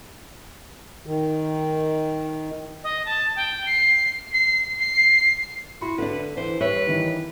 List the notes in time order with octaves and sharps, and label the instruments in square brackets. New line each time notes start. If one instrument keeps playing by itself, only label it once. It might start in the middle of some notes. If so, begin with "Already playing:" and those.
[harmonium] D#3
[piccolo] D#5
A5
G5
C7
C7
C7
[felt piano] E4 B5 C6 [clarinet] F#4
[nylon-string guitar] D3 D4 [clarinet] B4 [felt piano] E5
[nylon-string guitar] E3 [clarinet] C5
[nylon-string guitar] G3 C#5 E5 [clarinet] B4
[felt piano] D#3 E3 D#4